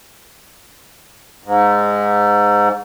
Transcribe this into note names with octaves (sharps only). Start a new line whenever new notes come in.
G#2